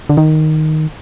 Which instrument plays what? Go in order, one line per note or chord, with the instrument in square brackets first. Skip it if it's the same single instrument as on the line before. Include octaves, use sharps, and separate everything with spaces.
[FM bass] D3
D#3